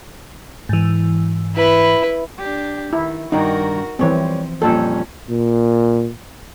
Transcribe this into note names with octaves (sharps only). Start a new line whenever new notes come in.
G#2 E3
E4 B4
D4 G4
D#3 E4
G2 D#3 D#4 F#4 A#4
E3 F3 G3 C4 C#5
F2 A#2 G3 C#4 A4
A#2